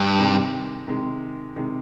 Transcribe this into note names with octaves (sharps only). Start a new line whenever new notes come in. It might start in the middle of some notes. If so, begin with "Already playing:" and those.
Already playing: G2
C3 D#3 G#3
C3 D#3 G#3
C3 D#3 G#3